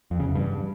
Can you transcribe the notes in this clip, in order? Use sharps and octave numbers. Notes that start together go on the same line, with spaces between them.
F2
C#3
E2
G2